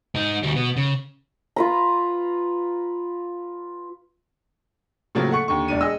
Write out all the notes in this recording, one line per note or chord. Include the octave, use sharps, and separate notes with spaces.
G#2 D#4
D2 G3
B2 B3
C#3
F4 B4 A#5
A2 C#3 F3 F#3 A#3
A3 F#5 C#6 C#7
D#2 D3 C#6
E1 D4 D#7
G#4 D#5 E6